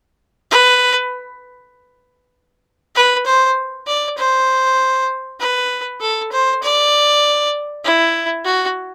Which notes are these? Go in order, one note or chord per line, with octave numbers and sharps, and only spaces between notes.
B4
B4
C5
D5
C5
B4
A4
C5
D5
E4
F#4